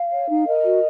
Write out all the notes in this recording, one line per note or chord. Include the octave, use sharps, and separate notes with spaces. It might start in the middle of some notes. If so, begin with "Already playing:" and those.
Already playing: F5
C#5
D#4
A#4 D#5
F#4